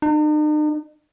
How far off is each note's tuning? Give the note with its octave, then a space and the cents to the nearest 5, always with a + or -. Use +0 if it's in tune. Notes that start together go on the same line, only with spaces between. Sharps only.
D#4 -45